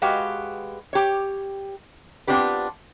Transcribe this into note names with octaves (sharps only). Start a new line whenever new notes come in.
G#3 F#4 G4 B4 F5
G4 C#5
B3 C4 D4 F4 G4 B4